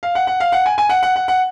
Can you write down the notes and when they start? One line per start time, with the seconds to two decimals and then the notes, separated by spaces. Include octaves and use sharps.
0.03 F5
0.15 F#5
0.27 F#5
0.40 F5
0.52 F#5
0.66 G#5
0.78 G#5
0.89 F#5
1.03 F#5
1.16 F#5
1.28 F#5